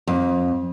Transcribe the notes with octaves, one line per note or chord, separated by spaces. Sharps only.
F2